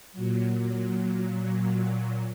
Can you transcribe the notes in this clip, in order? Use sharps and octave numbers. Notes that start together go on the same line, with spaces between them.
A#2 F#3